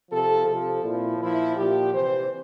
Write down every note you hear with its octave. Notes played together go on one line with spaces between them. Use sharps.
C3 F3 A4
C3 F3 A4
A#2 F3 E4
A#2 F3 E4
A#2 F3 G4
C3 E3 C5